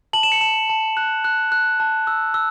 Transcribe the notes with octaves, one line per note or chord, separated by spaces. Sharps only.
A5 F#7
E7
C#7
A5 E7
A5
F#6
F#6
F#6
A5
E6
E6